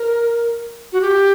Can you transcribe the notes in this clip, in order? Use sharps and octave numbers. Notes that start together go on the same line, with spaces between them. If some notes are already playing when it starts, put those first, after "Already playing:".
Already playing: A#4
F#4
G4